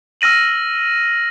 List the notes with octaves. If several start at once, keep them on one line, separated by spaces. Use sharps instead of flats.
E6 F6 A#6 D#7 F#7